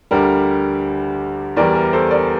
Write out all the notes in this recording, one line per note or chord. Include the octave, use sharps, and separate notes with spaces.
D2 D3 G3 A#4
E2 E3 G3 A#4 D5
A#4
A4 C5
A#4 D5